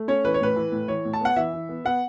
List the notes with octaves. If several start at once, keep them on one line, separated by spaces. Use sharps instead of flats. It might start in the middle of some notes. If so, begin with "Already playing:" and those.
Already playing: A3
C#4 C#5
E3 B4
C#5
A2 B4
E3
A2
E3 C#5
A2
A5
B3 F#5
E3 E5
E3
B3
B3 F#5